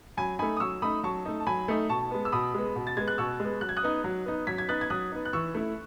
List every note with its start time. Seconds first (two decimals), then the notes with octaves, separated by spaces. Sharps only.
0.17 F#3 G#5 B5
0.39 A3 D#4 G#5 B5
0.57 D#6
0.60 F#3 C#6 E6
0.82 A3 D#4 B5 D#6
1.03 F#3 A5 C#6
1.25 A3 D#4
1.40 A5
1.47 F#3 G#5 B5
1.68 A3 D#4
1.89 B2 A5 C#6
2.11 G#3 B3
2.25 E6
2.32 B2 B5 D#6
2.54 G#3 B3
2.76 B2
2.87 A6
2.97 G#3 B3 G#6
3.08 F#6
3.18 B2 C#6 E6
3.40 G#3 B3
3.61 F#3 F#6
3.69 G#6
3.77 D#6 F#6
3.83 B3 D#4
4.04 F#3
4.26 B3 D#4
4.47 F#3 G#6 B6
4.58 G#6
4.69 B3 D#4 F#6 A6
4.81 G#6
4.90 F#3 D#6 F#6
5.12 B3 D#4
5.25 F#6
5.33 E3 C#6 E6
5.54 A3 E4